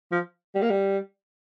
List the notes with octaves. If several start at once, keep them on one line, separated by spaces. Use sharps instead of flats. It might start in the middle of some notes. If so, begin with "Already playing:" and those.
F3
G3
A#3
G3